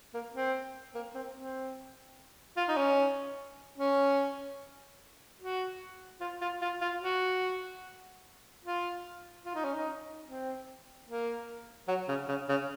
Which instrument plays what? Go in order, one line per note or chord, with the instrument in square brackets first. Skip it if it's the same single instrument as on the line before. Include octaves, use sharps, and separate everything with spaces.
[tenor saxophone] A#3
C4
A#3
C4
C4
F4
D#4
C#4
C#4
F#4
F4
F4
F4
F4
F#4
F4
F4
D#4
C#4
D#4
C4
A#3
F#3
C#3
C#3
C#3